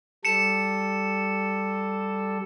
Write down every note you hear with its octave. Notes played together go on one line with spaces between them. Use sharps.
G3 A4 C#7 E7